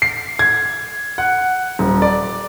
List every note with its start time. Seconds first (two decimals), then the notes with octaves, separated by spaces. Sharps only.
0.02 C7
0.39 G#6
1.18 F#5
1.79 D#1
2.02 D5